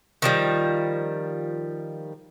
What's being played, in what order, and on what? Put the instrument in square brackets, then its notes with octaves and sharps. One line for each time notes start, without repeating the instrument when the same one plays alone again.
[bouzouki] D#3 F3 G3